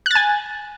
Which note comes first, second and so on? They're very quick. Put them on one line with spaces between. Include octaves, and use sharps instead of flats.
F#6 A6 G#5